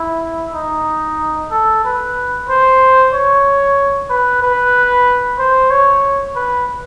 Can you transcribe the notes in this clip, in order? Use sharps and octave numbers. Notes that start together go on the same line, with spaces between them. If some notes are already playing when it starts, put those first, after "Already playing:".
Already playing: E4
D#4
A4
B4
C5
C#5
B4
B4
C5
C#5
B4